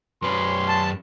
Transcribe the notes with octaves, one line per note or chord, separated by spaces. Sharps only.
F#2 C#4 B4 C6
A5